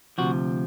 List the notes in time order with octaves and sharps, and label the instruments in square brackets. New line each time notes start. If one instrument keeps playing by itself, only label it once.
[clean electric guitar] D2 C3 F3 F#4